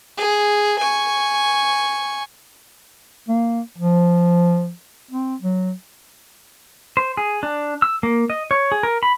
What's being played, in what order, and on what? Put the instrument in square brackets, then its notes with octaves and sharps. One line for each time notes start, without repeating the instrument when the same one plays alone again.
[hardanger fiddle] G#4
G#5 C#6
[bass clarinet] A#3
F3
C4
F#3
[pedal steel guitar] C5
G#4
D4
E6
A#3
D#5
C#5
G#4
A#4
B5